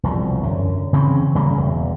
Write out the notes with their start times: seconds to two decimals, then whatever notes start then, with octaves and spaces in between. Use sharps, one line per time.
0.03 E1 C2 F3
0.43 F#2 D3
0.93 C#3 E3 C4 C#4
1.35 C#3 G3 G#3 A#3
1.57 E1 E2